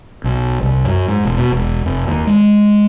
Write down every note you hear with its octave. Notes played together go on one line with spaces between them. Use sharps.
B1
C2
F#2
G#2
E1
B2
E1
F1
D#2
G#3